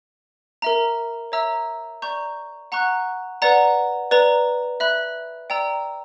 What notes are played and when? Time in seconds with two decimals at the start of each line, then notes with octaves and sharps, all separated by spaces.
0.62 A#4 E5 A#5
1.32 C#5 E5 A#5 E6
2.02 D5 A#5 C#6 G6
2.72 F#5 A#5 C#6 F#6
3.42 B4 D5 F#5 A#5
4.11 B4 D5 A#5
4.80 E5 B5 F#6
5.50 D5 G5 A#5 E6